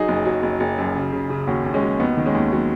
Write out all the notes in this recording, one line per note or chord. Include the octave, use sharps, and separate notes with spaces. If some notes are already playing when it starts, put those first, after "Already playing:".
Already playing: F#3 D#4 G#4
F#1
F#3
F#1
F#1
F#2
C#3
C#3
C#3
D#2 C#4 F#4
D#2
G#3 C#4
F#3
D#2 B3 D#4
D#3
G#3 C#4
D#2
F#3 B3